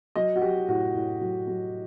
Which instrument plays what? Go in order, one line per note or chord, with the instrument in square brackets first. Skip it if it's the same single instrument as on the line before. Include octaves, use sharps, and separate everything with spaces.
[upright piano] F#3 D#5
F#4
F#3 G4
A2 F#4
A2
F#3
F#3